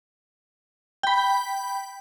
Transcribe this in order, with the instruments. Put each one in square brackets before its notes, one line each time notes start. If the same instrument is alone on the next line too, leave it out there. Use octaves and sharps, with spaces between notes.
[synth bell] G5 B5